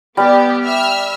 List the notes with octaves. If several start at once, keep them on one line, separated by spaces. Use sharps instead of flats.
G3 B3 G4 D5
E5 E6 F6